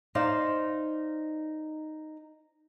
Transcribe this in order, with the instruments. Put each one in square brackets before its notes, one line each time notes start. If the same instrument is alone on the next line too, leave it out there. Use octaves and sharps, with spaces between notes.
[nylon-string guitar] D#4 C5 D5 F5